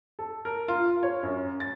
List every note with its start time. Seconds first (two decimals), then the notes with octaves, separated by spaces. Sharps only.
0.19 A4
0.45 A#4
0.68 F4
1.03 C#5
1.23 F#2
1.60 A6